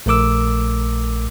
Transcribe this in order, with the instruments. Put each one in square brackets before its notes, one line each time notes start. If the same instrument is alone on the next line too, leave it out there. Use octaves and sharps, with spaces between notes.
[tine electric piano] A#1 A3 A#4 D6 E6